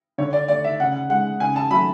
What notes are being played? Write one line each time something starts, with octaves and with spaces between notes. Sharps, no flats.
D3 C#5
D5
A3 D5
E5
C#3 F#5
G#3 F#5
C#3 G#5
A5
F#3 A3 B5